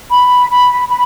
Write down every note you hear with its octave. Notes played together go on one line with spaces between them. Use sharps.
B5
B5
B5